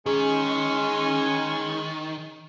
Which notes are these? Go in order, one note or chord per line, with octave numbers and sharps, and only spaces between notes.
D#3 G#3 C#4 G#4